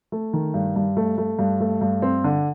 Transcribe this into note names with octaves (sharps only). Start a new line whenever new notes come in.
A3
D#3
G2
G2
A3
A3
G2
A3
G2
C4
D3